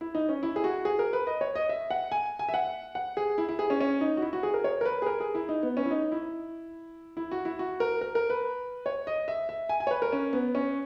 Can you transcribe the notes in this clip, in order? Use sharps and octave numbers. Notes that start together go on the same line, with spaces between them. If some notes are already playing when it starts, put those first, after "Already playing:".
E4
D#4
C#4
E4
G#4
F#4
G#4
A#4
B4
D#5
C#5
D#5
E5
F#5
G#5
G#5
E5
F#5
F#5
G#4
E4
E4
G#4
C#4
C#4
D#4
F#4
E4
F#4
G#4
A#4
C#5
A#4
B4
G#4
A#4
G#4
E4
D#4
B3
C#4
E4
D#4
E4
E4
F#4
E4
F#4
A#4
A#4
A#4
B4
C#5
D#5
E5
E5
G#5
G#5
C#5
B4
A#4
C#4
B3
C#4